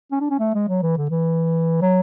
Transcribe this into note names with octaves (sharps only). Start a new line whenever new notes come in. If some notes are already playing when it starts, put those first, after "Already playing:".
C#4
D4
C#4
A3
G#3
F#3
E3
D3
E3
F#3